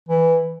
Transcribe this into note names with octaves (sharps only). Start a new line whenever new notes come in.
E3